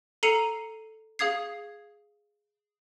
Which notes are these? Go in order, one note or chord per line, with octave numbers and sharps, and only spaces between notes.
A4 A#5 C7 C#7 D#7 F7
G#4 F5 D#6 G#6 C7